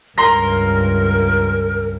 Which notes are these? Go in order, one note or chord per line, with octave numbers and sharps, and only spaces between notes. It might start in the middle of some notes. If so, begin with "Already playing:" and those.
C#2 G2 A#4 A#5 C6 A#6